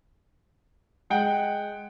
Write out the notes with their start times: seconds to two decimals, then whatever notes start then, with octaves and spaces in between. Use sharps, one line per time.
1.10 G#3 F#5 G5